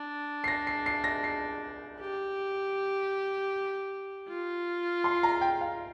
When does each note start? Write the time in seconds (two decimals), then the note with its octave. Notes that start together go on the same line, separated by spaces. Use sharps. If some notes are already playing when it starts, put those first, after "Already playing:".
Already playing: D4
0.44 C7
0.48 A#6
0.67 C7
0.86 C7
1.04 A#6
1.24 C7
2.00 G4
4.28 F4
5.04 C6
5.23 A#5
5.41 G5
5.61 F5